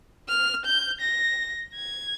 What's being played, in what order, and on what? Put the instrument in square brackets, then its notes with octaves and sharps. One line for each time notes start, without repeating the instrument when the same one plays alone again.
[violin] F6
G6
A#6
G#6